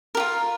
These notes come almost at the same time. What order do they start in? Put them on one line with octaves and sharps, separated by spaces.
A#4 G4 F4